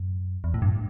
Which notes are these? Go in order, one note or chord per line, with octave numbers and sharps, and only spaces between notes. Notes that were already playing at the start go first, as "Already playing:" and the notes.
Already playing: F#2
E2
A2
G2